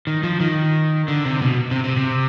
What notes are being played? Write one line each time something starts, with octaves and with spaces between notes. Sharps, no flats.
D#3
F3
D#3
D3
C3
B2
C3
C3
C3